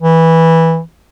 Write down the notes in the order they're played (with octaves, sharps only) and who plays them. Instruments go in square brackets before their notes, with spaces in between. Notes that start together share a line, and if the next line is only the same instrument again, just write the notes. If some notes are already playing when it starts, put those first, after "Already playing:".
[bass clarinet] E3